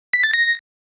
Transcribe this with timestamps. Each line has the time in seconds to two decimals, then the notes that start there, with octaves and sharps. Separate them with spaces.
0.13 B6
0.23 A6
0.34 A#6